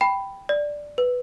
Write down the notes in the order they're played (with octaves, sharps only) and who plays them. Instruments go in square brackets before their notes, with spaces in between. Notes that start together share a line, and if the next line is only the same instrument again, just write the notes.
[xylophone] G5 B5
D5
B4